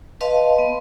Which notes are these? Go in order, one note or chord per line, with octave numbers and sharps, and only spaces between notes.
B4 D#5 F5 A5 C6
B3